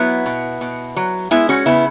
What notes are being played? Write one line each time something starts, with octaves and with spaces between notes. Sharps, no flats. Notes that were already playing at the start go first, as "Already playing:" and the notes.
Already playing: F#3 B3 E4
B2
B2
F#3
G#3 B3 E4
C#4 F#4
C#3 B3 E4